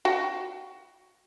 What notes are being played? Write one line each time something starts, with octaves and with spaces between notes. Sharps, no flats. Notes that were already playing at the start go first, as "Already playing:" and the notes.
F#4 G5